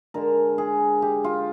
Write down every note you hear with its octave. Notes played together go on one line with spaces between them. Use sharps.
D3 G#3 A#4
G#4
G4
F4